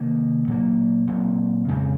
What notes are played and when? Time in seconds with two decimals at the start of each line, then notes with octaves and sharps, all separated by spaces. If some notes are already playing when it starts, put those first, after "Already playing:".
Already playing: C3 D#3 A#3
0.47 A#2 F#3 A#3
1.07 A#2 F#3 C4
1.68 F2 C#3 G#3 C4